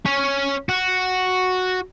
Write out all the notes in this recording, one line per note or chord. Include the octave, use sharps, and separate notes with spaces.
C#4 C#5
F#4